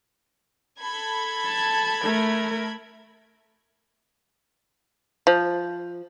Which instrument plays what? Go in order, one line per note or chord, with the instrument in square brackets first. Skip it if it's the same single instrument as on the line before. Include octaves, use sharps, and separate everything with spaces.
[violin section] A4 B5 G#6
[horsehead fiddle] A5
A3 A#4
[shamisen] F3